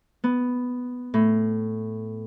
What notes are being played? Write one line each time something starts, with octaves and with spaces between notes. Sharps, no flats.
B3
A2